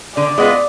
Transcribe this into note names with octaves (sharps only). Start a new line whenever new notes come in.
D3 D5
G#3 B3 F4